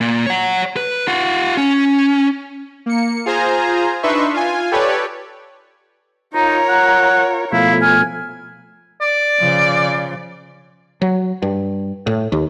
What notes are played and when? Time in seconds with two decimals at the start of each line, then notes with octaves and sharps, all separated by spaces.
0.01 A#2
0.26 C#5 F#5
0.77 B4
1.08 F4 F#5
1.57 C#4
2.86 A#3 C#7
3.26 F4 G#4 C5 G#5 A#5
4.03 D4 D#4 B4 E5 C6 C#6
4.34 F4 G#5
4.71 G4 A4 B4 C#5 D5
6.34 D#4 F4 A#4 C#5 A#5
6.69 F#5
7.52 B2 F3 A3 E4 F5
7.81 G#5 F6
9.01 D5
9.40 C#3 F3
11.02 F#3
11.42 G2
12.07 A2
12.32 D#2